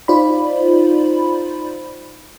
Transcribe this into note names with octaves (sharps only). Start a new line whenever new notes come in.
D#4 F4 C5 D5 B5